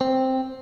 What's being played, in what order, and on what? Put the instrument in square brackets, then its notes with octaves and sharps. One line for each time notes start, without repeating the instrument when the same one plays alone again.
[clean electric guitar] C4